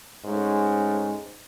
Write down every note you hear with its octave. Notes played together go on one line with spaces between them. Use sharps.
G#2 A3 C#4